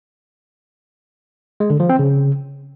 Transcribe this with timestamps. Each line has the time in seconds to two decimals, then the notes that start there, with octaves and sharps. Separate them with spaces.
1.60 G#3
1.70 D3
1.80 F3
1.89 C4
1.99 C#3